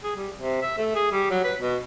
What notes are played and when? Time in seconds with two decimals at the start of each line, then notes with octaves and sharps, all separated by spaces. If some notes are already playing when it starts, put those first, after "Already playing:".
0.04 G#4
0.16 G3
0.35 C3
0.62 E5
0.78 A3
0.95 G#4
1.12 G3
1.30 F#3
1.44 B4
1.60 B2